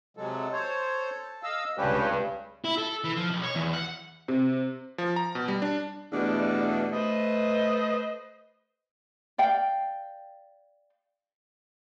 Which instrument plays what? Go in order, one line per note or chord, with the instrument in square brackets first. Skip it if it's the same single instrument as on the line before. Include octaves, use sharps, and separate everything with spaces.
[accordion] C3 F#3 G#3 [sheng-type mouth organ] A4
[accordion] C5 C#5
D#5 F5 E6
[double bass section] C#2 C3 [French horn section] G2 [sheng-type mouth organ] C#4 G4 [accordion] B4
[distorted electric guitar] E4
A4
E3
F3
B1
C#5
E2
F#5
[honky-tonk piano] C3
[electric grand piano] F3
A#5
B2
G3
D4
[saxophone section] E2 B2 G3 A3 D4
A3 B4 C5 D#5
[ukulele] D5 F5 G5